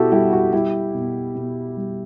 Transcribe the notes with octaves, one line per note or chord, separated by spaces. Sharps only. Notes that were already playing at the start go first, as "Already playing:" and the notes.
Already playing: B2 E4 F#4 G4 A4
G3 E4 G4
F#4
G3 E4 G4
B2
B2
G3